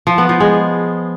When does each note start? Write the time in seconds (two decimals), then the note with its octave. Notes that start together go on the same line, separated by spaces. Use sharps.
0.07 F3
0.18 B3
0.29 F3
0.40 G#3